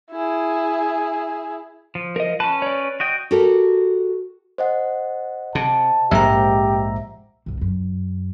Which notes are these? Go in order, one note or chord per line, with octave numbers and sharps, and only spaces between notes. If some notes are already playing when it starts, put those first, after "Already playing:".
E4 G#4
F3
A#4 D#5
C#4 B4 A5
C#5 D5
F#4 D#5 G5
F#4 G4 A4 A#4
C5 D#5 F#5
C3 A5
A#1 G#2 G#3 G4 E5 A#5
C2 C3
F#2